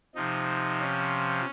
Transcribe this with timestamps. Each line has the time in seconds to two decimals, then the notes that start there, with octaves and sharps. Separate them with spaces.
0.15 C3 F3 D#4
0.80 C#4